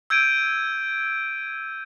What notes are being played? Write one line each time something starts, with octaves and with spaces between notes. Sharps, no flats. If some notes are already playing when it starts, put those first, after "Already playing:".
E6 G6 G#6 D7 D#7